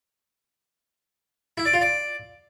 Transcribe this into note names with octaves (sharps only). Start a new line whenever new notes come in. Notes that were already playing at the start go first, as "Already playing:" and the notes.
E4
D5
F4
D5